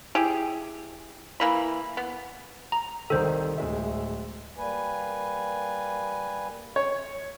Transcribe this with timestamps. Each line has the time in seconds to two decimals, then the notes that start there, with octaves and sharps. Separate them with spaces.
0.15 E4 G4 G#4
1.40 E3 A#3 B5
1.97 B3
2.72 A#5
3.10 C2 D#3 A4 C5
3.58 D1 G#3 E5
4.58 G3 A#3 B4 G#5
6.76 C#5